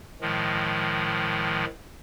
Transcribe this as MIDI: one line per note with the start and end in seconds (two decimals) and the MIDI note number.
0.21 1.65 45
0.21 1.65 51
0.21 1.65 53
0.21 1.65 56